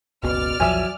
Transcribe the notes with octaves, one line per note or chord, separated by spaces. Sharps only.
F#1 C#2 B2 D5 F6
A#1 E2 F3 F#3 E5 G#5